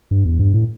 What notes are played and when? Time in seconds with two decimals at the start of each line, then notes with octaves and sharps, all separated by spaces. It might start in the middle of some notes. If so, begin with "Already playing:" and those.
0.11 G2
0.25 E2
0.39 G2
0.54 A2